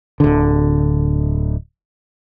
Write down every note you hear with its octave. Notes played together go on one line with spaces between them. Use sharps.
D1 D3